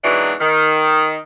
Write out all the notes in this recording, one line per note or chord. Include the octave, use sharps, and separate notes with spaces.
G#2 B2 E3 F#3 D4
D#3